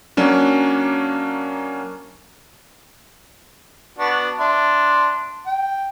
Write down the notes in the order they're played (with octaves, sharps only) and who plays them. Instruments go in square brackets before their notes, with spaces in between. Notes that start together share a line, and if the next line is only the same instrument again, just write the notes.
[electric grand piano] F#3 A#3 C#4 D4
[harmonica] B3 D4 F#4
D4 E5 C6
G5